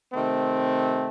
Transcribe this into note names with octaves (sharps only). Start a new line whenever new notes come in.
C3 D#3 A3 C4